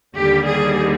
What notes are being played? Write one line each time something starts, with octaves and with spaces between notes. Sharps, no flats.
D#2 D3 G3 G4
G#4